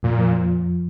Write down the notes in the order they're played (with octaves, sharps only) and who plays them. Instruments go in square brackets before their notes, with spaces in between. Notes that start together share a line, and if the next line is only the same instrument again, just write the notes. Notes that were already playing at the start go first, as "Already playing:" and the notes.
[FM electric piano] F2 [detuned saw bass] A#2
[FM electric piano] F3